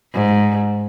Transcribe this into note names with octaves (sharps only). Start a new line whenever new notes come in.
G#2